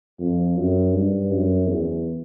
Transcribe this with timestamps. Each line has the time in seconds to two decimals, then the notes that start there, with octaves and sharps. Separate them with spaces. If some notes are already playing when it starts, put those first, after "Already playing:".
0.20 F2
0.57 F#2
0.93 G2
1.31 F#2
1.68 E2